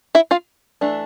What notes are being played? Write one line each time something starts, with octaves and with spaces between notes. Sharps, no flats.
E4 E5
F4 F5
E3 A3 D4